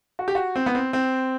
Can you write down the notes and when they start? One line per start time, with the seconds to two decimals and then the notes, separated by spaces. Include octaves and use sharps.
0.19 F#4
0.28 G4
0.35 F#4
0.56 C4
0.66 B3
0.75 C4
0.93 C4